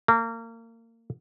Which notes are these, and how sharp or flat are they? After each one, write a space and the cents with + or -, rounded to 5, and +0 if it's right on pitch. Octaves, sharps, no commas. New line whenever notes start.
A#3 -30